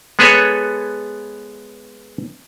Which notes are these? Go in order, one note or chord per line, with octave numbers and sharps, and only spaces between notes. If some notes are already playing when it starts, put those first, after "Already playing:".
G#3 B3 G#4 A4 B4 C#5